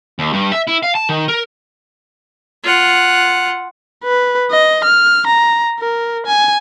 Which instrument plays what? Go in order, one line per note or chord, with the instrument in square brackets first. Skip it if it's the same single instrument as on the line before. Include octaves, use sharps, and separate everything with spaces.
[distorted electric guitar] D#2
G2
E5
E4
F5
A5
D#3
A#4
[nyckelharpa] F4 F#5
[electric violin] B4
D#5
F6
A#5
A#4
G#5